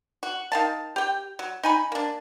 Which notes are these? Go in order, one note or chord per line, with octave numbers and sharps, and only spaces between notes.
F#4
D#3 F5 A5
G4 G5
F#3
D#4 G#5 B5
A#3 D4